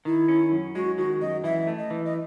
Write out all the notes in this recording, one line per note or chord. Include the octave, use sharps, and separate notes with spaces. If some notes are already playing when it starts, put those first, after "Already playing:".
D#3 E4
C#4
F#2
G#3 F#4
D#3 F#4
F#2 D#5
E3 E5
A3
D#5
E3
D#5